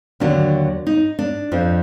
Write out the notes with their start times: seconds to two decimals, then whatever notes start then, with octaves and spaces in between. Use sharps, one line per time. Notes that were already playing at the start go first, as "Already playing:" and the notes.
0.20 D#2 D3 F#3 D4
0.87 D#4
1.19 D4
1.52 F2 F3